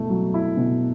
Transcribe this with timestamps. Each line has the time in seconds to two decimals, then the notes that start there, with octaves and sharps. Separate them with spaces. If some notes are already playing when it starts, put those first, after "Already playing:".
Already playing: B2 A3 E4
0.10 F#3
0.34 E4
0.57 B2